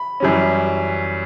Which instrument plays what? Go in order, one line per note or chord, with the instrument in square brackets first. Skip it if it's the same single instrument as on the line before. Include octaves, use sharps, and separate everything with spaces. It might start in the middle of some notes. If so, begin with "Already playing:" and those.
Already playing: [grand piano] B5
F#2 E3 G3 C#4